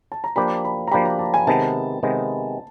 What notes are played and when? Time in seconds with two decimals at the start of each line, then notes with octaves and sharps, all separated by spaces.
0.12 A5
0.24 A#5
0.36 F3 A#3 D4 G4 B5
0.65 B5
0.88 A#5
0.91 F3 A#3 D4 G4 B5
1.05 A#5
1.19 A5
1.34 G#5
1.47 C3 D#3 G#3 B3 A5
2.03 C3 D#3 G#3 B3